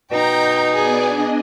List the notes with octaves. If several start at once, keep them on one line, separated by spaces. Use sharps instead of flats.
B2 D#4 G5 A#5 G6
B3 G#4 D5 G#5
D4 D#5